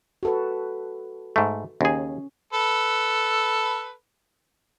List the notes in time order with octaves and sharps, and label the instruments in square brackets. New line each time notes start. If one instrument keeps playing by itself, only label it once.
[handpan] F#4 A4 B4
[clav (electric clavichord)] G#2 A3
[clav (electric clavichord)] D#2 G#4 [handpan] C#4
[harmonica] A4 B4